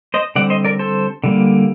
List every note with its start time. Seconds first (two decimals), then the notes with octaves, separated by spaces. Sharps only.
0.14 C5 D#5
0.36 D3 G3 C4 D5 F#5
0.50 C5 D#5
0.64 A#4 D5
0.79 A4 C5
1.24 D3 G3 A#3